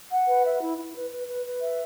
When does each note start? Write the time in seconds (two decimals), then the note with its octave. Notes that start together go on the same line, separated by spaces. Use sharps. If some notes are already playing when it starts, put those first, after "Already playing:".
0.09 F#5
0.26 B4
0.43 E5
0.59 E4
0.76 E4
0.94 B4
1.10 B4
1.26 B4
1.44 B4
1.61 E5